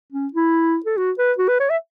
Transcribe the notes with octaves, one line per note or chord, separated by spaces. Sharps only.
C#4
E4
A4
F#4
B4
F#4
B4
C#5
E5